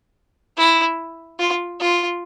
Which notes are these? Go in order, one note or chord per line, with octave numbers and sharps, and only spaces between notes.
E4
F4
F4